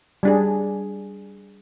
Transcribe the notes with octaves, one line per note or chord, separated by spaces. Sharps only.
G3 D4 G#4